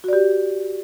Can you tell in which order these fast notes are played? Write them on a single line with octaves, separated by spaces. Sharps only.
F#4 D5 G4